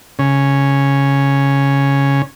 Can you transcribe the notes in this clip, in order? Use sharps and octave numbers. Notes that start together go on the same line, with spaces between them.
C#3 C#4